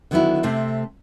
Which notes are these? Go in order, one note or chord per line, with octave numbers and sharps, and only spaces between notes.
D3 D#3 F#3 B3 D#4 E4
C3 A3 C4